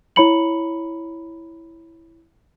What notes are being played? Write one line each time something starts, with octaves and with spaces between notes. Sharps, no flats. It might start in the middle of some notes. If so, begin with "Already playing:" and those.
E4 C#5 A#5 B5 C#7 F#7